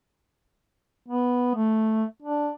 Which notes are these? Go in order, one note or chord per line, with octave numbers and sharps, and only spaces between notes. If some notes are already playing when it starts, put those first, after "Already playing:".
B3
A3
D4